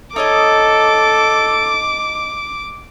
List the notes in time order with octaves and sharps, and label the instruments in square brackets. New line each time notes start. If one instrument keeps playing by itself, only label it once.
[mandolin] D#4 C#5 D#5 [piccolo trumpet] A4 [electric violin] D6